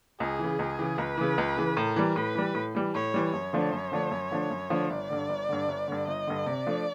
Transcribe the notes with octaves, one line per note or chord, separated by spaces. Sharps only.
C#2 G#4
C#3 E3
C#2
C#3 E3
C#2 B4
C#3 E3
C#2
C#3 E3
A2 A#4
E3 G3
A2 B4
E3 G3
A2
E3 G3
A2 C#5
E3 G3
F#2 C#5
D3 F3 A3 D4
F#2
D3 F3 A3 D4
F#2
D3 F3 A3 D4
F#2
D3 F3 A3 D4
G1 D5
G2 D3
G1
G2 D3
G1
G2 D3
G1 D#5
G2 D3
C3 D5
F3 A3 D4